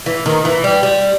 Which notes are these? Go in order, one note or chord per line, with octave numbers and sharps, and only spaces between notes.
E3
D#3
E3
G3
G3